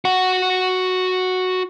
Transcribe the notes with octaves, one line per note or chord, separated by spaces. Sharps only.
F#4 F#5